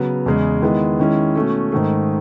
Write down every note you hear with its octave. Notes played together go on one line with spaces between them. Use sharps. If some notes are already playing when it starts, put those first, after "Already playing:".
Already playing: C#3 F#3 B3
E2 C#3 G#3
D#3 G#3 B3 E4
D#3 G#3 C#4 E4
B2 A3 C#4
G#2 D#3 A3